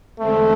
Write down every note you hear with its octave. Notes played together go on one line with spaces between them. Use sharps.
E2 D3 G#3 A3 C4